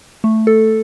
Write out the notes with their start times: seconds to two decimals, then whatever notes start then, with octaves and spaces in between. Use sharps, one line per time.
0.24 A3
0.47 A4